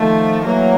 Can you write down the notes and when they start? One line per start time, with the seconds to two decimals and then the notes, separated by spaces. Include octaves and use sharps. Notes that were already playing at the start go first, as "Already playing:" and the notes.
Already playing: D#3 F3 A3
0.44 E3 F#3 A#3